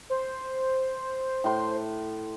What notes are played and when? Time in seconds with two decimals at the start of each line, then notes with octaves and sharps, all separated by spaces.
0.10 C5
1.44 A2 C6